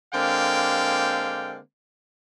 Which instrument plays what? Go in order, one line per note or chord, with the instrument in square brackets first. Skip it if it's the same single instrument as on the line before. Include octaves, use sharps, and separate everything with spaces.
[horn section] D3 G#3 A#3 C4 F5 G5